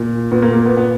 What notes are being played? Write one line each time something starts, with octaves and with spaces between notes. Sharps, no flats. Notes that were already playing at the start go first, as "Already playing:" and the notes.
Already playing: A#2
A#2 B3
A#3
A#3
B3
A#2 B3